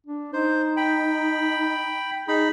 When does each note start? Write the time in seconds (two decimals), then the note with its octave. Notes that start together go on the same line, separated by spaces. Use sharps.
0.07 D4
0.33 D#4 C5
0.77 G5 B5
2.28 D#4 G#4 B5